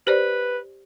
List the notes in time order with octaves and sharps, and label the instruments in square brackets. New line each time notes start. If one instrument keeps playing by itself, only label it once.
[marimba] G4 C5 D5 [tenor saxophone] B4